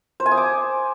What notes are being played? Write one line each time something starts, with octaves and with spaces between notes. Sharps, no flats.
C5
G#5
D#6
D6